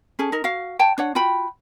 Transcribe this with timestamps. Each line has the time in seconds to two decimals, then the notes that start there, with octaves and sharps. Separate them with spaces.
0.19 C#4 G#4 A4
0.32 D#4 A#4
0.44 F#4 F5
0.79 C#5 G5 A5
0.98 D4 C#5 F#5
1.15 F4 F#4 G5 B5